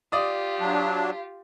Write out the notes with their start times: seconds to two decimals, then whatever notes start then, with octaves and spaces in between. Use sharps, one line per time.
0.12 F4 G4 D5 D#6
0.60 F#3 D4